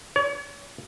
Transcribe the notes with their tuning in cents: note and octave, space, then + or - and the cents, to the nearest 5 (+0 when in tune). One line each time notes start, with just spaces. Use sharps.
C#5 +40